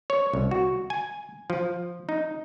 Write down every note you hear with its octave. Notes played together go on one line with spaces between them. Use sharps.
C#5
C2
F#4
G#5
F3
D#4